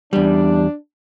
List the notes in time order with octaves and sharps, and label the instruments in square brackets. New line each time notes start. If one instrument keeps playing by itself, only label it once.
[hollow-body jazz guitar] E2 G3 [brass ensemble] D4